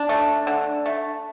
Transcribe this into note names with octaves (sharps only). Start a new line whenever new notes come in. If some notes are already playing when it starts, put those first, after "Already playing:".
Already playing: D4
A3
D3
A3